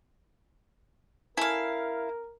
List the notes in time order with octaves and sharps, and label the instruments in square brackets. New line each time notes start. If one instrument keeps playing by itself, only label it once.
[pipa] C#4 A4 G#5 [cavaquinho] E4 F5 [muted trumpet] A#4